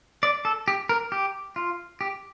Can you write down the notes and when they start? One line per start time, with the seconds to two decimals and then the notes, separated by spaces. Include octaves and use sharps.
0.23 D5
0.45 A4
0.68 G4
0.89 A#4
1.12 G4
1.56 F4
2.01 G4